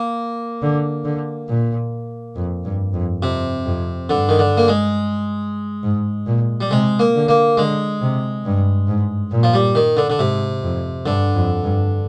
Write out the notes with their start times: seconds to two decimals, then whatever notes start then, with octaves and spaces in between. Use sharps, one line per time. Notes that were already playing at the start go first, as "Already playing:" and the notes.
Already playing: A#3
0.62 D3
1.04 D3
1.48 A#2
2.36 F2
2.64 G2
2.93 F2
3.22 F2 C3
3.66 F2
4.09 G2 D3
4.29 D#3
4.39 D3
4.57 A#3
4.68 G#3
5.83 G#2
6.27 A#2
6.61 G3
6.70 C3 G#3
6.99 A#3
7.15 D3
7.28 A#3
7.57 D3 G#3
8.01 C3
8.45 G2
8.88 G#2
9.31 A#2
9.43 F3
9.54 G3
9.75 D#3
9.97 D3
10.10 D3
10.19 G#2 C3
10.62 F2
11.06 G2 D3
11.34 F2
11.64 G2